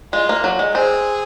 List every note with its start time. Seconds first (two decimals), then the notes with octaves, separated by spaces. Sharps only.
0.13 G#3 F4
0.29 A#3
0.44 F#3
0.59 G#3
0.74 C4 G#4